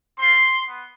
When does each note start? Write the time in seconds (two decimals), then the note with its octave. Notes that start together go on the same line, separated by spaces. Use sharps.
0.19 C4 F4 C6
0.66 B3